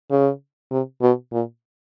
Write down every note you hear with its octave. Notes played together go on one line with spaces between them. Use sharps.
C#3
C3
B2
A#2